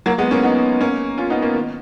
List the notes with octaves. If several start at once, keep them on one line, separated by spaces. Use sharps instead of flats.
F#3 A#3
G#3 B3
A#3 C#4
B3 D#4
A#3 C#4
C#4 F4
B3 D#4
A#3 C#4
D#3